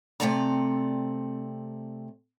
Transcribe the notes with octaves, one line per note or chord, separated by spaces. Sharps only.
C3 E3 A3 C4 D5 A#5